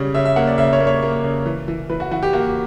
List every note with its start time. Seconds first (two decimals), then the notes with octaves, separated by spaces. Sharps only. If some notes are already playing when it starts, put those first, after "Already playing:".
Already playing: C#3 G3 C#5
0.14 C#3 E5
0.25 E5
0.36 A#3 F#5
0.47 D5
0.58 C#3 E5
0.73 C#5
0.80 A#3
0.87 C#5
1.03 A#3
1.24 C#3
1.46 E3
1.68 E3
1.90 E3 B4
2.00 F#4
2.11 E3 F#4
2.23 G4
2.33 A#3 F#4